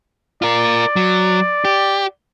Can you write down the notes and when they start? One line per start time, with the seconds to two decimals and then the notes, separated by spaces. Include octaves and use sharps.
0.42 F4 A#4 D5
0.96 F#3
1.65 G4